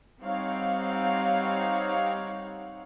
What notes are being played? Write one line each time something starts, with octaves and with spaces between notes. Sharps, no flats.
G3 C4 D#4 C#5 F5 F#5